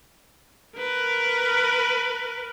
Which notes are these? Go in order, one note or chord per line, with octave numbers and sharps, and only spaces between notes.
A#4 B4